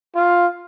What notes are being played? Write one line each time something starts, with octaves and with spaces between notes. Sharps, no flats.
F4